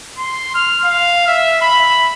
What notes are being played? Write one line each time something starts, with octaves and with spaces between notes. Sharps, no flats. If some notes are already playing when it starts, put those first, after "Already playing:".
C6
F6
F5
E5
B5